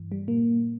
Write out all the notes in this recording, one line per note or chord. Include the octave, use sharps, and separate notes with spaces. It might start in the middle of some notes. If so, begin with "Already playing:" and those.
Already playing: G2 E3
G3
A#2 A#3